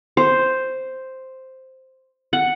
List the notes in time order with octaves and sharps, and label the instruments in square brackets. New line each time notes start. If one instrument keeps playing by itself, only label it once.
[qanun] C5
F#5